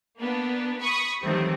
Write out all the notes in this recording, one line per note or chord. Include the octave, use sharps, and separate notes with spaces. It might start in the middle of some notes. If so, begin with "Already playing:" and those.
A#3 B3 D4
B5 C#6 D#6
D#3 E3 F#3 G3 A3 C4